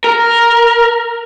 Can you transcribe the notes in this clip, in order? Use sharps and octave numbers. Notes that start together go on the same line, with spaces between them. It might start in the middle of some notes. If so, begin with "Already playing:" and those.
A#4